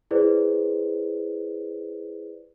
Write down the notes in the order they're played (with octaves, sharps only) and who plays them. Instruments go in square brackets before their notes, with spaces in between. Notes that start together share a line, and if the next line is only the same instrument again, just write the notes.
[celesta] E4 G#4 B4 C5 D5